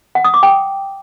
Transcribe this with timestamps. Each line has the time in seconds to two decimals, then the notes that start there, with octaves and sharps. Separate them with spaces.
0.15 F#5
0.24 D#6
0.34 D6
0.43 G5